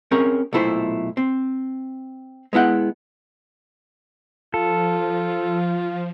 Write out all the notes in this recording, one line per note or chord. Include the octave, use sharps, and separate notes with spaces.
C4 C#4 G#4 A#4 C#5
B1 A#2 A3 E4 G#4 C5
C4
G#3 B3 E4 F#5 G5
F3 F4 A4